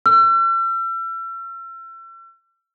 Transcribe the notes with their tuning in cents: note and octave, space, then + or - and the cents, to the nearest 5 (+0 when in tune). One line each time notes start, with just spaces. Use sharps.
E6 +40